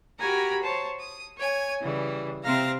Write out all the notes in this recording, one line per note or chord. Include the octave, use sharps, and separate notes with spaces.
F#4 G4 A#4 G#5 A#5 B5
C5 C#5 A5
D#6
C#5 G#5
C#3 E3 G3
C3 C4 E5 F5 A#5 A#6